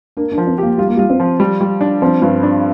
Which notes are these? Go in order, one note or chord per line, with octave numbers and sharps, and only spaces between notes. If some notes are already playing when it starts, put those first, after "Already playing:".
A#3 D4
D4
F3
C4
A#3 G4
G3 F4
A#3
G3 F4
C4
F3
G3
G3
D4
F3 C4
G2
D4